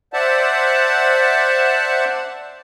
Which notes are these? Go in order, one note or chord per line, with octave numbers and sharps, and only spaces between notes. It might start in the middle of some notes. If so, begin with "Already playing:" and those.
C5 D5 E5 F#5 A5